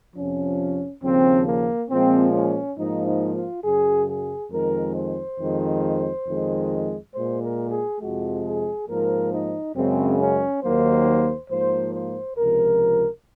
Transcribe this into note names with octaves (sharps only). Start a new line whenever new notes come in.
F2 C3 F3 C#4
D#2 C#3 F3 C4
A#3
A#2 F3 G#3 C4
C#4
G#2 F3 A#3 D#4
D#4
F4
F#2 C#3 F#3 G#4
G#4
F2 D#3 G#3 A#4
C5
F2 D#3 G#3
F2 D#3 G#3
A#2 G#3 C5
A#4
G#4
F2 C3 F3 G#3 F#4
G#4
G#2 F3 A#3 A#4
D#4
F#2 C#3 G#3 C4
C#4
D#2 D#3 F#3 A#3 C5
G#2 F3 A#3 C5
C5
C#2 C3 F3 A#4